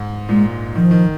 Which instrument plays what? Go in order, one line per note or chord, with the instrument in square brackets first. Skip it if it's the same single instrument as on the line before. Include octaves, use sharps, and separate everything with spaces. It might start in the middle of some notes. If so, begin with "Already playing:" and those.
Already playing: [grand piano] G#2
[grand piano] A#2 [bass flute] G#3
[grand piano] D#3 [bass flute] F3
[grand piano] D#3